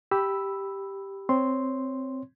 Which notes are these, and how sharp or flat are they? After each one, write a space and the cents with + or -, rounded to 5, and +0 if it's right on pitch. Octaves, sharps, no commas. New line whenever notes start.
G4 +0 B5 +0 E6 +0
C4 +0 C#5 +5 C6 +0